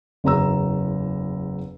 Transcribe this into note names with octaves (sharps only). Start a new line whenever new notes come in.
F#1 E2 A#5 E6